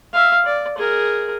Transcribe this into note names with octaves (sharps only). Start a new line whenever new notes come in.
E5 F5
D5
G#4 A#4